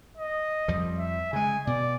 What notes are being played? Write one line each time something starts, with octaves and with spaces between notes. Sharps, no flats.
D#5
F2 F3 G3
E5
C#3 G#3 G#5
B2 D5